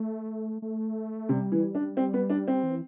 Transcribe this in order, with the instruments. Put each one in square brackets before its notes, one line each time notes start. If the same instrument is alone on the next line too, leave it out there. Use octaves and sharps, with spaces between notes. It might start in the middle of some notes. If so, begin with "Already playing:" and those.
Already playing: [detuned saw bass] A3
A3
[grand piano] C3 [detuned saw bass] G3
[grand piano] E3
D4
C4
B3
D4
C4
[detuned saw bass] E3